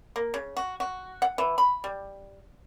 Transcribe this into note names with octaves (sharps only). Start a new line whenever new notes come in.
A#3
C#3
F#4
F#4
F#5
E3
B5
G3